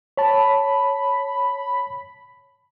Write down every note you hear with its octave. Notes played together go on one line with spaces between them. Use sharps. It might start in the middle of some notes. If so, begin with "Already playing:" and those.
C#5 A5 B5